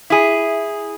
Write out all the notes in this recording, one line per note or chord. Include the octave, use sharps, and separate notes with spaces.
E4 G#4